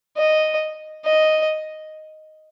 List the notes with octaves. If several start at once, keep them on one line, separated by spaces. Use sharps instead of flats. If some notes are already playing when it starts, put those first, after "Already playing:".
D#5
D#5